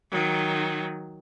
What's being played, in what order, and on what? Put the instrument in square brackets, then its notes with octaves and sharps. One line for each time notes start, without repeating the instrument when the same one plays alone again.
[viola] D#3 F#3